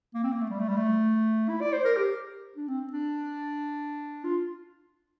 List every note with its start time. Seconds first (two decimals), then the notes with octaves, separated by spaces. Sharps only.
0.15 A#3
0.23 C4
0.32 A#3
0.41 A3
0.50 G3
0.59 A3
0.68 G3
0.77 A3
1.49 E4
1.61 D5
1.73 C5
1.85 A#4
1.97 G4
2.56 D4
2.68 C4
2.92 D4
4.24 F4